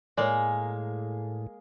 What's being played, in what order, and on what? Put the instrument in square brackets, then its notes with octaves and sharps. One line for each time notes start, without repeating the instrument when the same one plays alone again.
[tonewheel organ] A2 [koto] G#3 A#3 [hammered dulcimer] G#4 [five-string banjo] C#5 D5